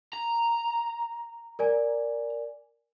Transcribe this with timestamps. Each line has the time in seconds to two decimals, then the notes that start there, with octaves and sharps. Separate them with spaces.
0.13 A#5
1.59 A#4 D5 G#5